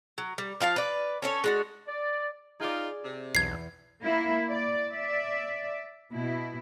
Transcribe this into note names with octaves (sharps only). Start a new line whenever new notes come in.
F#3
G3
F3 F4 F5 A5
B4 D5
C#4 A4 C#5
G#3 D4 F#4
D5
D#4 F4 G#4 D5
C3
B1 E2 G#6 C7
A#3 E4
D5
D5 E5
B2 E4